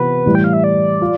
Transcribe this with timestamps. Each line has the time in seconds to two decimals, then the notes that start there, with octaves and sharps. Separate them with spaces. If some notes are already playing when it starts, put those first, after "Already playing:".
Already playing: C3 E3 B3 F4 B4
0.26 A2 E3 G3
0.35 G5
0.44 F5
0.53 E5
0.64 D5
1.01 F4